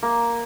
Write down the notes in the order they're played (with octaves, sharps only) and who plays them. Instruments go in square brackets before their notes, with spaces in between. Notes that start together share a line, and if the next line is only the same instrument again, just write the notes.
[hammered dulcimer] A#3